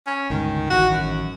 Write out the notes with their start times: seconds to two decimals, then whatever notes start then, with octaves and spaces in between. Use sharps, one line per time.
0.06 C#4
0.30 G1 C#2 D#3
0.70 A1 D#3 E3 F#4
0.91 F#2